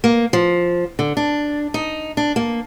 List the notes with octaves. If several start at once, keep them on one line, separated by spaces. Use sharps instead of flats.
A#3
F3
D3
D4
D#4
D4
A#3